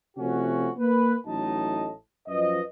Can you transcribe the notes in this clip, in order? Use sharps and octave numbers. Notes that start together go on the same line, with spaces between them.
C3 F3 A3 C#4 F#4
A#3 B4
A1 A2 F#3 D#4 D#5 A5
F#2 F3 B4 D#5